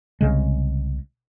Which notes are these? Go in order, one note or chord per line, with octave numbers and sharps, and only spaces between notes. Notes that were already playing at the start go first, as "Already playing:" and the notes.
C2 C#3 G#3